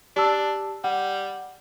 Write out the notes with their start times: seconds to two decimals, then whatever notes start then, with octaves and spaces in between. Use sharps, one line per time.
0.16 D4 G4 A5 E6
0.84 G3 F#5